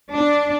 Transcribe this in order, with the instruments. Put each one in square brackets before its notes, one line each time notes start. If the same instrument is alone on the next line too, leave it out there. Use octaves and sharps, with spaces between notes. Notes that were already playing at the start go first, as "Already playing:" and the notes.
[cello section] D4